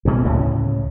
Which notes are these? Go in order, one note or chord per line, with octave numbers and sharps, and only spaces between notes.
D2 B2 G#3
D2 A2 C#3